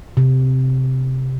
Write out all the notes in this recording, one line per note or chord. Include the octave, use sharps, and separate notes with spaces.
C3